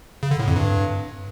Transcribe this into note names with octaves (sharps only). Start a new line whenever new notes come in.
C#3
D3
A2
F2
G2